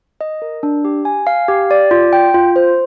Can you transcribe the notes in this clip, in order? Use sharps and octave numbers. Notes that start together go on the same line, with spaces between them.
D#5
A#4
D4
G4
G#5
F5
G4
D5
F4
G5
F4
C5